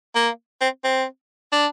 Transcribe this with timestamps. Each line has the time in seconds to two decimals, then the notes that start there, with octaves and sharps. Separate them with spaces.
0.15 A#3
0.61 C4
0.84 C4
1.52 D4